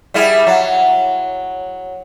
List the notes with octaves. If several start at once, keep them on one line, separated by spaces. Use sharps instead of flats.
G3 E4 G#4
F#3